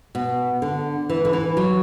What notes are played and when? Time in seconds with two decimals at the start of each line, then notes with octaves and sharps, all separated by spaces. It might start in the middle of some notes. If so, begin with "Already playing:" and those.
0.15 B2
0.62 D3
1.09 E3
1.25 D3
1.33 E3
1.57 F#3